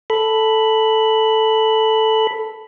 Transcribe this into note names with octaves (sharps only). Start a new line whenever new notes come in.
A4 B5